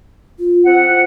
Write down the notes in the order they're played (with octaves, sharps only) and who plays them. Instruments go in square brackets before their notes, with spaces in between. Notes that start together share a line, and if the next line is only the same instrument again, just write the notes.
[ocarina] F4
[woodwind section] C4 F#5